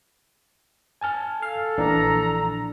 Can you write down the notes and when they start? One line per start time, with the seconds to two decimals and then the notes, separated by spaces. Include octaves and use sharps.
1.01 G#5 A5 F6
1.42 A4 F5
1.78 A#1 E3 D4 A#5